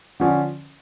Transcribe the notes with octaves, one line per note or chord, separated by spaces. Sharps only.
D3 F3 C#4